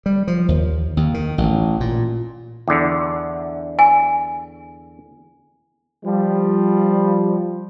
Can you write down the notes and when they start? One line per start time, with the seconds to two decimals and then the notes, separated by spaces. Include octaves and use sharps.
0.06 G3
0.28 F3
0.48 D#2
0.97 D#2
1.14 D#3
1.38 A1
1.80 A#2
2.68 E2 D3
3.79 G#5
6.04 F3 G3